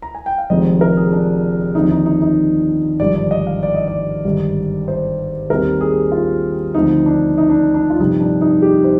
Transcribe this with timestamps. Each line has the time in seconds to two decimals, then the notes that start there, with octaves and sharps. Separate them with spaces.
0.02 A#5
0.15 G#5
0.26 G5
0.38 F5
0.50 F1 F2 D#3 G#3 C4 D#5
0.81 A#4
0.97 G#4
1.12 D4
1.75 D#2 D3 F3 C4 D#4
1.91 D#4
2.06 D#4
2.22 D#4
3.00 G#1 G2 D3 F3 D5
3.16 D5
3.31 D#5
3.47 F5
3.63 D5
3.75 D#5
3.88 D5
4.25 G#1 G2 D3
4.88 C5
5.50 D#2 D#3 G3 C4 A#4
5.81 G#4
6.12 F4
6.75 D2 D3 F3 C4 D#4
7.06 D4
7.38 D#4
7.50 D4
7.74 D4
7.90 F4
7.99 G1 F2 C3 D#4
8.20 D4
8.41 D#4
8.62 G4
8.84 C5